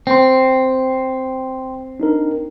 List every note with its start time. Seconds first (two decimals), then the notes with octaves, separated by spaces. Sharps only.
0.07 C4 G5 C6
2.00 D4 D#4 A#4